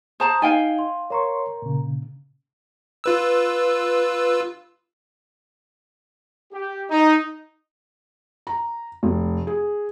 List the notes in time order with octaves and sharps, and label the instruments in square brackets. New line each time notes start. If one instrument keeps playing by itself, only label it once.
[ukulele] C5 A5 A#5 [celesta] D#6
[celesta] D#4 D#5 G7 [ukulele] F5 G5 G#5
[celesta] C6
[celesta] A#4 A#5 [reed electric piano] C#5 C6 C#6
[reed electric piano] A#2 C#3
[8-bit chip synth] F4 B4 E6
[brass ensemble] G4
D#4
[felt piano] A#5
F1
G#4